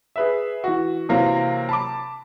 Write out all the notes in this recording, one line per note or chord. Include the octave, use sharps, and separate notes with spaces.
G#4 B4 E5
E3 F#4
C3 E3 F#3 A#3 C4
A5 B5 D6